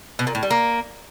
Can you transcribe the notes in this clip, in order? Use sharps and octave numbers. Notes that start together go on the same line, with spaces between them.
B2
A#2
A2
G3
A#3